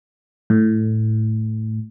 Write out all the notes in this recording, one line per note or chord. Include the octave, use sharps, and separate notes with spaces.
A2